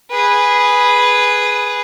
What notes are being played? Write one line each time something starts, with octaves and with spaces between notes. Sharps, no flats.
G#4 B4